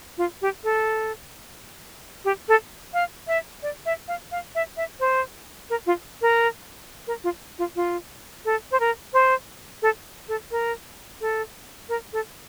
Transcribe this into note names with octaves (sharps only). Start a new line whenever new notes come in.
F4
G4
A4
G4
A4
F5
E5
D5
E5
F5
F5
E5
E5
C5
A#4
F4
A#4
A#4
F4
F4
F4
A4
C5
A#4
C5
A4
A4
A#4
A4
A#4
A4